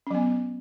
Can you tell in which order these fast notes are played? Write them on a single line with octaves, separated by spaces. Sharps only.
C#4 F#3 B3